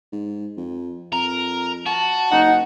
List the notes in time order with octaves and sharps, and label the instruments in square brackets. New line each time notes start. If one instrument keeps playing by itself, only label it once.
[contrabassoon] G#2
F2
[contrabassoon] F2 [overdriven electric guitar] A#4
[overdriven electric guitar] F#4 [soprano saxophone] A5
[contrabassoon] F#1 [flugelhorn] D#4 [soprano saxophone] F#5